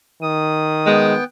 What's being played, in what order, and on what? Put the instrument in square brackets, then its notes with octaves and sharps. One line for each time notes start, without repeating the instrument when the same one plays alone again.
[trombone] D#3 [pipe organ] D#6
[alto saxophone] G#3 [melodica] B3 G5